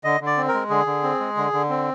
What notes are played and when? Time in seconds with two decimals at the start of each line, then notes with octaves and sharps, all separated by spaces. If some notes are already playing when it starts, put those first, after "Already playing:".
0.04 D3 D#5
0.21 D3
0.26 D5
0.37 C4
0.48 A#4
0.54 G#3
0.70 D3 G#4
0.86 D3
1.03 C4
1.20 G#3
1.37 D3
1.53 D3
1.69 C4